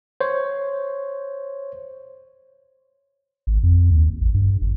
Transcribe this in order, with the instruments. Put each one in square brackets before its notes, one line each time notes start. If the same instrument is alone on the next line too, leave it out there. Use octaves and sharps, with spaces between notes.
[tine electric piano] C5 C#5
[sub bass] G#1
F2
D#2
A1
G2
G1